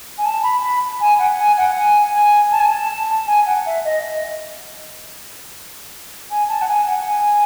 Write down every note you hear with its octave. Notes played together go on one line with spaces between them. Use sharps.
G#5
A5
B5
B5
G#5
F#5
G#5
F#5
G#5
G#5
A5
G#5
A5
G#5
F#5
E5
D#5
G#5
A5
F#5
G#5
F#5
G#5